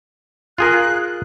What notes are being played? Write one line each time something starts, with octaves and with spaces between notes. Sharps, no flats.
F4 G#4 A#4 F#6